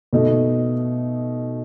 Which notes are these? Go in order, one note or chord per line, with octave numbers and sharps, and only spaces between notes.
B2 A3 D#4